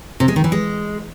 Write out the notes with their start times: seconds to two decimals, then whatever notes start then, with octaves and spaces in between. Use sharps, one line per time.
0.20 C3
0.28 G#3
0.36 D#3
0.44 E3
0.52 G#3